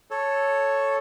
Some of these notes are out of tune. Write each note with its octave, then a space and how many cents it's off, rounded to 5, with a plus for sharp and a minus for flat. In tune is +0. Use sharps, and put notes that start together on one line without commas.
A4 +0 C#5 +0